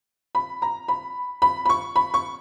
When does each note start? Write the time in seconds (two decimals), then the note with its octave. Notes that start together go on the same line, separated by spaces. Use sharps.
0.35 B5
0.62 A#5
0.88 B5
1.42 B5
1.65 B5
1.69 C#6
1.96 B5
2.14 C#6